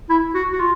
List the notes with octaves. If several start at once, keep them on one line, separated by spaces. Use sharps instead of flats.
E4
F#4
F#4
F4